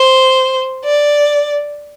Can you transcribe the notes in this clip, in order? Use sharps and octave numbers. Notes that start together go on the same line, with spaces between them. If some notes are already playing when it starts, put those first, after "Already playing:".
Already playing: C5
D5